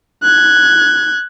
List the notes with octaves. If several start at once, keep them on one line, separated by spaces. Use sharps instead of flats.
F#6 G#6